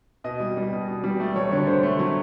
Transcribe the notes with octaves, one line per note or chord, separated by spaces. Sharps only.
B2 D#5
G3
G3
B2
B2
G3
A3 D5
F#3 C#5
D3 C#5
D3 C5
A3
F#3